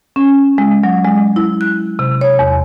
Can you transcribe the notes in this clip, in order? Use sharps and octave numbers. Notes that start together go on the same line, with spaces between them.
C#4
G#3
F#3
G#3
E4
F#6
C3
C#5
E2